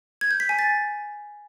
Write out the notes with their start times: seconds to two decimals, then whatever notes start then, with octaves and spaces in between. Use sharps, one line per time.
0.21 G#6
0.31 G6
0.40 B6
0.49 G#5
0.59 A6